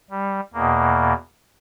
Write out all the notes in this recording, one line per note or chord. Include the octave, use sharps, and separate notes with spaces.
G3
E2 B2 A#3